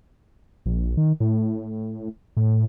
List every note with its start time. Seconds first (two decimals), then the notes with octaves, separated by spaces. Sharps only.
0.66 A#1
0.97 D#3
1.20 A2
2.37 A2